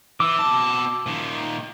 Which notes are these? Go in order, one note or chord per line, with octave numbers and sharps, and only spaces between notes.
E3 D6 E6
B2 A5
A#2 D#3